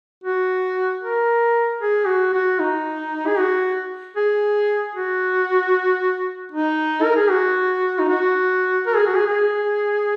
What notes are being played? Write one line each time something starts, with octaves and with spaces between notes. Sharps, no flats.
F#4
A#4
G#4
F#4
F#4
D#4
G#4
F#4
G#4
F#4
D#4
A#4
G#4
F#4
D#4
F#4
A#4
G#4
F#4
G#4
G#4